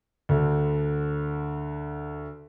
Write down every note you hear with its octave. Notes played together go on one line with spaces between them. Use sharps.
D2 D3